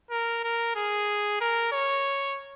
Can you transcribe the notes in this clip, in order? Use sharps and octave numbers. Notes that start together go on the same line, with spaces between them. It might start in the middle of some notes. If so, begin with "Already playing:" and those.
A#4
A#4
G#4
A#4
C#5